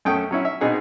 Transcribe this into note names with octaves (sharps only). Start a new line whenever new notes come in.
F#2 A3 C#4 G5 A5 D#6
F#3 C#4 E4
E5
B2 C4 D#4 G#4 F#5